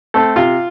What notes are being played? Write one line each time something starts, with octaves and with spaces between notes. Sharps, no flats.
A3 C4 A4
C3 F4